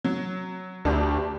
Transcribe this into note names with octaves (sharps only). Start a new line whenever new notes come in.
F#3
D2 D4 G4